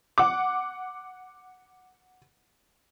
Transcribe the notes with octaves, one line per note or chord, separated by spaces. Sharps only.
F#5 D6